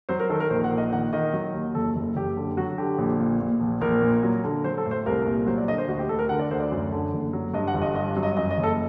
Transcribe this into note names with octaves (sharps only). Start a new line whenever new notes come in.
F#3 C5
A#4
D#3 A4
A#4
A#1 C5
F#5
A#1
D#5
D#3 F#5
D#3 D#5
F#3
D#2
F#1 A4
F#1
F#1 G4
D3
F#3 F#4
D3 G4
A#1
A#2
A#2
A#1
A#1 A#4
A#2
F#3
D3
F#3 C5
A4
A2
C5
C2 A#4
A#2
F#3 C5
D5
D3 D#5
C5
D2 F#4
G4
D2 A4
A#4
D3 F#5
D5
D2 C5
D5
F#2
D3
F#1
F#3
G2 D#5
F#5
G1
D#5
G2 D#5
F#3
D#5
F#2 D#5
D#5
F#1
A4